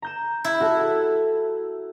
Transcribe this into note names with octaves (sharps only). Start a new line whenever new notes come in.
A#5 G6 E7
E4
F#4 A4 E5